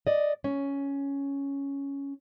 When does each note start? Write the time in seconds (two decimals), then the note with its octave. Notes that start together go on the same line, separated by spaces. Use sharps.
0.07 D5 D#5
0.44 C#4